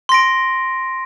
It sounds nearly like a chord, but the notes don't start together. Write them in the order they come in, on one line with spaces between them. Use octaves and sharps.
C6 A#6 D7